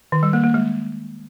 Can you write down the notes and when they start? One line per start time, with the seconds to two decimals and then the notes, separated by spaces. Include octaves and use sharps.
0.12 D#3
0.23 G3
0.33 A#3
0.44 A#3
0.54 G#3